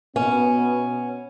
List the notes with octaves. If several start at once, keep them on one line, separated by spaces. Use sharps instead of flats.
B2 B3 C#4